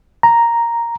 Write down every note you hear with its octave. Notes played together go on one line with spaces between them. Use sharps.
A#5